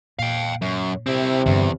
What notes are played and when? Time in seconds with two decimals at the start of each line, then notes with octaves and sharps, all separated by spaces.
0.19 A#2 F5 G5
0.62 F#2
1.07 C3 C4 E4
1.46 E2 G2 D3